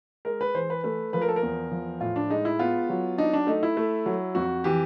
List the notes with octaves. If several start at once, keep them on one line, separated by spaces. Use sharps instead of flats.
G#3 A#4
B4
E3 C5
B4
A3 B4
F3 B4
A#4
A4
A#4
E2
F3
A2 F4
D4
G#3 D#4
E4
B3 F4
F#3
D4 D#4
D4
A3 D#4
E4
A3
F#3
F2 F#4
E3 G4